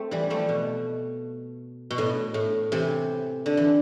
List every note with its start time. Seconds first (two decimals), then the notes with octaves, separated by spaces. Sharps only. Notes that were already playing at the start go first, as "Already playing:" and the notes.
Already playing: A3 C4
0.11 E3 G3
0.30 F3 A3
0.49 B2
1.91 B2
1.98 A2
2.34 A2
2.72 C3 E3
3.46 D3
3.57 E3